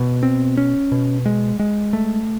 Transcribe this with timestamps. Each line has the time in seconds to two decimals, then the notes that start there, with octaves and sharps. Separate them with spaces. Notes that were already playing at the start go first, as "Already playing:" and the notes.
Already playing: B2
0.23 C4
0.57 C#4
0.92 B2
1.26 G#3
1.59 G#3
1.93 A3